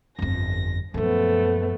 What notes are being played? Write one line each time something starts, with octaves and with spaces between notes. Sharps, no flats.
G1 F2 A#6
F#2 A#2 F3 A3 B3